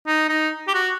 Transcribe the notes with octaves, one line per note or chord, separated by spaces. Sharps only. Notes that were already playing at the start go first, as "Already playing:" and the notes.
D#4
D#4
G4
F#4